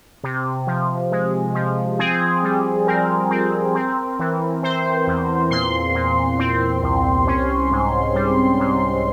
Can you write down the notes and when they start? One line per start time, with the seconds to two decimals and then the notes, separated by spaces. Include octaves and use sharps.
0.24 C3
0.67 F3
1.12 G#3
1.54 F3
1.99 C4 G#4
2.43 G3
2.87 C4 A#4
3.31 C4
3.75 C4
4.19 E3
4.63 C4 C5
5.07 E2
5.51 A#2 C6
5.95 A#2
6.39 C4
6.82 C2
7.27 C#4
7.71 G#2
8.15 G3
8.59 G#2